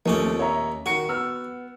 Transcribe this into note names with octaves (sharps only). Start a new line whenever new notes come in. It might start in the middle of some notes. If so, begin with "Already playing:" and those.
D#2 F3 A3 C4 C#4 D6
C#5 E5 A#5
D#3 F#4 C#7
B3 E6 F6